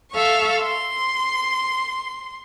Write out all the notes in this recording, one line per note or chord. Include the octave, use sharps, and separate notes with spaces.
A4 E5 F5 C#6
C6